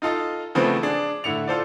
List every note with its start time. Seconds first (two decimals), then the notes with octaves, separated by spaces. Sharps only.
0.02 D#4 F4 A4 D#5
0.55 C#3 E3 F3 A3 B3 C4
0.83 D4 G#4
1.24 A2 D3 E4 C#7 F7
1.47 F4 A4 C5 D5